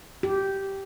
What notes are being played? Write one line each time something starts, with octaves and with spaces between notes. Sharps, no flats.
G4